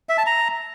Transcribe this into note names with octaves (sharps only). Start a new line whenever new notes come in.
E5
A5
A#5